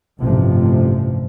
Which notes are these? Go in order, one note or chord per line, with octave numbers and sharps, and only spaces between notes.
A1 G2 C3 F3